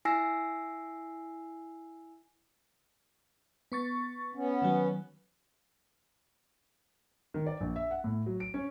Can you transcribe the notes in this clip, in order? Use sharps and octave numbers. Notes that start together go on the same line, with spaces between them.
E4 G#5 E6 A#6 C7
B3 C#6 A6
B3 C#4
D#3 F#3
D#3
D5
A#1
E5
F#5
A2
F#3
D7
C#4